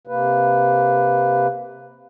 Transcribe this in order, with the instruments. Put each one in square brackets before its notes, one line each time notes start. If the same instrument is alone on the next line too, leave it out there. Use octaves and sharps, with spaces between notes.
[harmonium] C3 A#3 B4